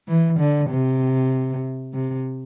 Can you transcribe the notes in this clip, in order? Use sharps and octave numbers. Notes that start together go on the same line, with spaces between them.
E3
D3
C3
C3